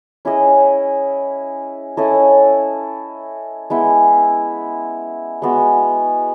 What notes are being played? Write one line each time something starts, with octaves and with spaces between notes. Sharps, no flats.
C#4 E4 G#4 D#5
C#4 E4 A4 D#5
G#3 B3 E4
G#3 B3 F#4